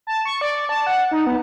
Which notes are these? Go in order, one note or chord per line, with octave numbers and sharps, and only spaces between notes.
A5
C#6
D5
A5
F#5
D#4
B3